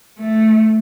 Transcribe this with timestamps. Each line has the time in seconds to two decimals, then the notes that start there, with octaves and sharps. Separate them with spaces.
0.19 A3